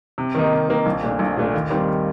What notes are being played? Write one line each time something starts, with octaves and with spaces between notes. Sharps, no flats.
C3
D#3 A#3 D#4
C3
D#3 A#3 D#4
A#1
A#2 A3 D4
A#1
A#2 A3 D4
D#2
D#3 G3 C4